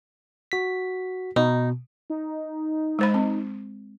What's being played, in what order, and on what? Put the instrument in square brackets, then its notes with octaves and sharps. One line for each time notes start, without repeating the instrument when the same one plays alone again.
[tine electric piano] F#4 B6
[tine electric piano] B2 [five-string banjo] D#4
[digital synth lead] D#4
[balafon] G#3 C5 B5
C4